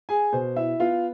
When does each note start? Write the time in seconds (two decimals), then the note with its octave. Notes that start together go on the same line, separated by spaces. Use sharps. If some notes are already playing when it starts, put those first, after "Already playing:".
0.09 G#4 G#5
0.33 B2 C5
0.56 E4 E5
0.80 B3 F4 F5